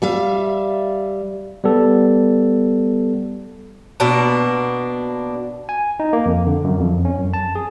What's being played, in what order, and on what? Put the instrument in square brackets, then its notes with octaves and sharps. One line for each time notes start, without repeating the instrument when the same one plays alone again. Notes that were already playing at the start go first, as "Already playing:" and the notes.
[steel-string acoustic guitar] G3 E5 F5
[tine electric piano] G3 B3 A4
[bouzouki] B2 A#3 D4
[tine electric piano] G#5
D#4
A#3
F2
D3
F#2
F2
C#4
F#2
A5
G#4